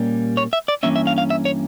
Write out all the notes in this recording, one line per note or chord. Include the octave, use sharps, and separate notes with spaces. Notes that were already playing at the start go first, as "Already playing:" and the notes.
Already playing: A#2 G3 A#3 C#4
C#5
E5
D5
G2 E3 A#3 C#4 E5
E5
F5
F5
E5
C#5